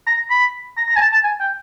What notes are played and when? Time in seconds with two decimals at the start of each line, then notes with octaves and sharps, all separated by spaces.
0.07 A#5
0.30 B5
0.77 A#5
0.89 A#5
0.96 G#5
1.01 A5
1.12 A5
1.24 G#5
1.40 G5